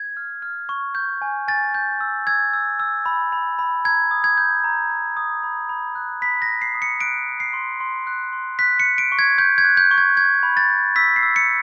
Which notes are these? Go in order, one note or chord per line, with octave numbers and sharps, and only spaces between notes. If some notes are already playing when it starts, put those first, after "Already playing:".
Already playing: G#6
F6
F6
C#6
G6
G#5
G#5 A6
G6
E6
E6 G#6
E6
E6
B5
B5
B5
A#5 G#6
D#6
G#6
G6
A#5
G6
D#6
B5
B5
F#6
B5 B6
A#6
F#6
C7
D#6
C#7
F#6 D7
D#6
C7
C6
C6
F#6
C6
F#6 B6
C#7
F#6
D7
C#6
G#6
C#6 G6
G#6
F#6
G6
C#6
G#6
G6 G#6
B5
A6
G6
E6 B6
C7
E6
C#7